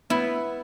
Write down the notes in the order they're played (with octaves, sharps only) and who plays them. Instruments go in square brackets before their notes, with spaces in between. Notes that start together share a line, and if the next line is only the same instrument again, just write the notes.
[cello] B3 [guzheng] E4